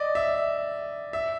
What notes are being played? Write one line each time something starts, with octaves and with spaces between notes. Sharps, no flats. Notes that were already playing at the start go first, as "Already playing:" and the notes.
Already playing: D5 D#5
E5
E5